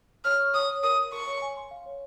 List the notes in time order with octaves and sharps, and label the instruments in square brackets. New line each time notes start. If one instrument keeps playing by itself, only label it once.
[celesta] C#5 [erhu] F6
[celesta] C#6
[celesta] C#5 [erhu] D#6
[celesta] C#5
[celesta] A#4 [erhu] D#6
[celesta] A#4
[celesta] A#4 [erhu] C#6
[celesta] C#5
G#5
C6
F5
C#5